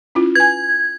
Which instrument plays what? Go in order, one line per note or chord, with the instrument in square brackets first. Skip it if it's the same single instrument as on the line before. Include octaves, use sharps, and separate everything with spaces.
[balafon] C#4 E4 F4
[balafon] B4 G#5 [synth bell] G#6